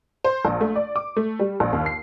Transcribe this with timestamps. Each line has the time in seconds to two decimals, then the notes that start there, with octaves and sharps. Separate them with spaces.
0.24 C5
0.45 A#1
0.61 A3
0.76 D5
0.96 D6
1.16 A3
1.39 G3
1.60 A#1
1.72 D#2
1.86 C7